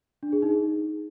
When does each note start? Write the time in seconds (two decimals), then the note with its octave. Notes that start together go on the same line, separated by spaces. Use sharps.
0.23 D4
0.32 G#4
0.42 D#4